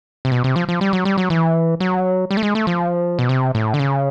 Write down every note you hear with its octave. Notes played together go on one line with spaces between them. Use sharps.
C3
B2
C3
F3
F3
G3
F#3
G3
F#3
E3
F#3
G3
A3
G#3
A3
F3
B2
C3
A2
D3
C#3